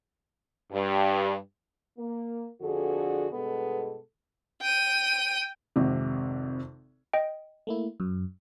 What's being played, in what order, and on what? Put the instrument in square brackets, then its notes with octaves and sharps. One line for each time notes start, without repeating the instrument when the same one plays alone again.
[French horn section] G2
A#3
F2 D3 D4 F#4 G#4 A4
G2 B2 G#3 B3 A4
[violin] G5 D#7
[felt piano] G#1 F2 C3
[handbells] D#5 G5
[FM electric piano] A3 A#3 E4
F#2